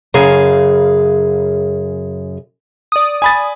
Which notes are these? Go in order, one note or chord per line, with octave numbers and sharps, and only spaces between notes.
F#2 C#3 G#4 F5
D5 D#6
G#5 B5 A6